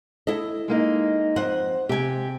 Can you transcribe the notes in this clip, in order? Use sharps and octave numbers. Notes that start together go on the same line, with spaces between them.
E4 A4 D#5
G#3 A#3 D#4
F2 C5 D#5 F#5
C3 G4 G#5